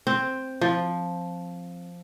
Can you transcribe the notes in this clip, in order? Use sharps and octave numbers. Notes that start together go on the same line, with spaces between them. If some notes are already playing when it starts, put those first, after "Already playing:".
C4
F3